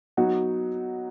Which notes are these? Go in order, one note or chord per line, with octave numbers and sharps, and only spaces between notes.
F#3 B3 D#4 F#4